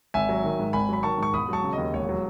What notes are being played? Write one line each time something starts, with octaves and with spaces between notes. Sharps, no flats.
G#1 E5 G#5
F#3
D#3
G#2
G#1 G#5 B5
F#3 B5
D#3 A5 C#6
G#2 C#6
E1 B5 D#6
F#3 A5 C#6
C#3
D#5
D#2
E1 C#5
F#3